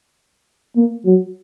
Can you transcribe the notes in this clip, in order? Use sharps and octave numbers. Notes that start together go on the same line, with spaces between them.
A#3
F#3